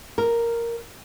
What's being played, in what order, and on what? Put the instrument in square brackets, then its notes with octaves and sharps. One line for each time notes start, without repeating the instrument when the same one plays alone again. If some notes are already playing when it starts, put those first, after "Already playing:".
[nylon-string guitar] A#4